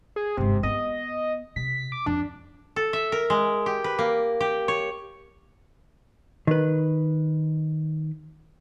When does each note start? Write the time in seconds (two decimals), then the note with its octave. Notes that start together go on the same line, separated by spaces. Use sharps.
0.16 G#4
0.37 G1 G#2 C3
0.63 B3 D#5
1.56 C3 B6
1.92 D6
2.06 F2 D4
2.76 A4
2.93 E5
3.12 A#4
3.30 G#3
3.66 G4
3.84 B4
3.99 A#3
4.41 G4
4.68 C#5
6.47 D#3 B4